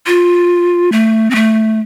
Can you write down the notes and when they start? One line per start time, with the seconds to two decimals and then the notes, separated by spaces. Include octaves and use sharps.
0.07 F4
0.92 A3
1.31 C4
1.35 A3